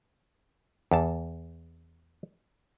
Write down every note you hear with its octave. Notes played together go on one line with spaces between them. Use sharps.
E2 A5